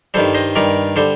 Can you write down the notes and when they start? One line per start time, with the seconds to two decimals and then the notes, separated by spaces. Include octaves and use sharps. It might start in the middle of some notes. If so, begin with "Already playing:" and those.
0.14 G2 D#3 G3 A4 C5
0.34 C5 D#5
0.55 G2 D#3 G3 A#4 D5
0.96 D3 G3 A4 C5